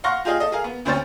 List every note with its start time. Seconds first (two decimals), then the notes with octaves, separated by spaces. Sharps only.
0.04 F5 F#5 C6 C#6 F6 A#6
0.25 F4 G4 G#4 D#5 F5
0.40 A4 D#5
0.52 G#4 A#4 F5
0.64 B3
0.85 D2 C4 C#4 C5 C#5 A6